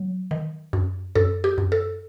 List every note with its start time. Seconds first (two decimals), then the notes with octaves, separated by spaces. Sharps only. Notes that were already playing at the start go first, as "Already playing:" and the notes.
Already playing: F#3
0.31 D#3
0.73 F#2
1.15 F#2 A4
1.44 G4
1.58 F#2
1.72 A4